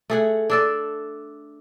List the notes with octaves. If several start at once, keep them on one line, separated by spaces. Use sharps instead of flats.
A3 G#4 F#5
D4 A4 D5